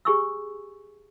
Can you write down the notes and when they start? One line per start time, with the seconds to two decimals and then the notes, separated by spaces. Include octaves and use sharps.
0.05 G4 G#4 G#5 C#6 D#6 E6